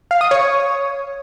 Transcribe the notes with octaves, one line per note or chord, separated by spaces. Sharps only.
F5
D#6
C#5